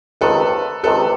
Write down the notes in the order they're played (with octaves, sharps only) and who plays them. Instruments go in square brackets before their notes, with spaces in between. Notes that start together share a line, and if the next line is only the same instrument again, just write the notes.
[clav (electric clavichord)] C#2 C3 D#3 [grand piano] A4 B4
[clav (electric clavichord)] C#2 C3 D#3 [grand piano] A4 B4